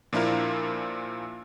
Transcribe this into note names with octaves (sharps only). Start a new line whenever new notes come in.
A#2 F3 D4 E4 F4 A#4